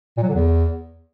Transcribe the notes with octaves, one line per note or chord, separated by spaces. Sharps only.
A#2
F#3
D3
E2